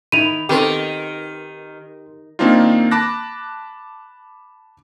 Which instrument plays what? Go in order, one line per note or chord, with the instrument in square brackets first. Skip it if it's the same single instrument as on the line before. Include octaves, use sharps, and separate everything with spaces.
[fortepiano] D#3 E4 [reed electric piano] B5 [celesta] D#7 F7
[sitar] D#3 [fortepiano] B3 C4 A4 [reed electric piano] G4 C6
[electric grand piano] D#3 A#3 C4 D4 D#4 F4
A5 B5 D6 F#6 A#6